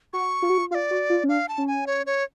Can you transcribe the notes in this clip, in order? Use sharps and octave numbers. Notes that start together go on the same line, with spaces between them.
F#4 C#6
F4
F#4
F4
F4 F5
D5
F#4
F4
C#4
D4 F5
A5
C#4
G#5
C#5
C#5